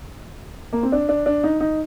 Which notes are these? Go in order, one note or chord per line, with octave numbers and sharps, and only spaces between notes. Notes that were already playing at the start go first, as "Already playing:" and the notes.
A#3
C4
D4
D4
D4
D#4
D#4